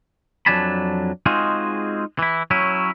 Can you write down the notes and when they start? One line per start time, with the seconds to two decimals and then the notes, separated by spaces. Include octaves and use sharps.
0.46 F2 F#3 D4 G#5 A5 B5
1.26 G#3 C4 D#4 F4 F#4 G#4
2.19 E3 E4
2.51 F#3 C#4 E4